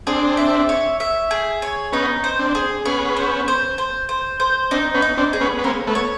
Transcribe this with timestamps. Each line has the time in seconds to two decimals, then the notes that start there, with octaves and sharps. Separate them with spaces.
0.07 C4 D4 G#4
0.37 E5
0.69 C#5
1.00 E5
1.31 G#4
1.62 C#5
1.92 B3 C#4 D#4
2.24 C5
2.39 C4 D4
2.55 G#4
2.85 B3 C#4 G#4
3.17 C5
3.48 C5
3.78 C5
4.09 C5
4.40 C5
4.71 C4 D4 D#4
4.94 B3 C#4
5.02 D#4
5.17 C4 D4
5.33 G#4
5.41 B3 C#4
5.58 B3
5.64 A#3 C4 C#5
5.87 A3 B3
5.95 C#5